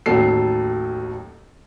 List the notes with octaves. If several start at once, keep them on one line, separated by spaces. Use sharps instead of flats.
A1 D#2 F#3 A4 C7